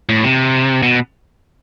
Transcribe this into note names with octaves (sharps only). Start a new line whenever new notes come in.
A2
C3
B2